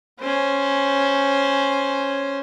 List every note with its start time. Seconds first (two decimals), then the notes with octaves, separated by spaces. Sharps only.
0.20 C#4 C5